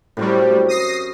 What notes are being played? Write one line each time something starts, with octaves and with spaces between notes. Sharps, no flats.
F#2 A2 C3 G3 C#6
D#6 A#6 C7